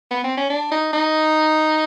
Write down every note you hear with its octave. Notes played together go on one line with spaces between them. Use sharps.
B3
C4
C#4
D4
D#4
D#4